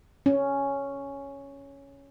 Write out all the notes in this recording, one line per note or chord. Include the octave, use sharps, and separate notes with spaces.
C#4